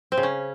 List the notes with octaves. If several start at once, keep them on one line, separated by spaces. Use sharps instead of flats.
C4
C#3
C#4